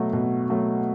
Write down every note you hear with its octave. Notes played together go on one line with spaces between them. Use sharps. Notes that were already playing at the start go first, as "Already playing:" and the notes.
Already playing: B2 F#3 A3
B2
F#3 A3